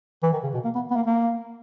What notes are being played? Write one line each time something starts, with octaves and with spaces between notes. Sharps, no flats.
E3
D#3
C#3
B2
A#3
B3
B3
A#3
A#3